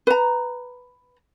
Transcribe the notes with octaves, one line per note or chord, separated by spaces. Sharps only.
B4 A#5